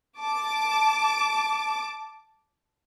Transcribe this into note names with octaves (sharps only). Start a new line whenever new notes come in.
A5 D6